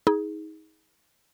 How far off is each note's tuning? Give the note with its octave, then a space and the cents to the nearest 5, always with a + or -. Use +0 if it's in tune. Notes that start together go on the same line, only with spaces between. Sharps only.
D#4 +30 G#4 +0